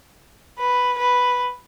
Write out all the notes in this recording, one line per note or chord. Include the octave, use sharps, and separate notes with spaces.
B4
B4